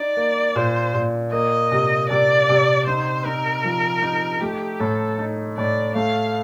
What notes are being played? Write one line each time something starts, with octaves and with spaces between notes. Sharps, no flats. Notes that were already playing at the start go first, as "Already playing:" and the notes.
Already playing: D#4 D5
A#3
A#2 C5
A#2
A#3 D#5
C3
C3 D5
C3
D#4 C5
D#4 A#4
F3
D#4
A3 G4
A2 A4
D#4
A2 D5
A3 F5